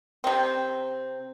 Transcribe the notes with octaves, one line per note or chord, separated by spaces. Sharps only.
C3 C4